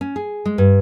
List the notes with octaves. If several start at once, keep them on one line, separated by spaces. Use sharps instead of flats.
C#4
G#4
G#3
G2